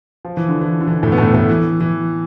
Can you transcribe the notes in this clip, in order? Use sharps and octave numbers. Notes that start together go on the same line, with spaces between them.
F3
E3
D3
E3
D3
E3
A2 A3
B3
A2 A3
A2 A3
E3
E3